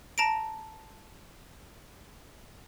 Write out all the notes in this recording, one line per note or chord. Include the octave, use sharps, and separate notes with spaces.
A5 A#5 A#6 D7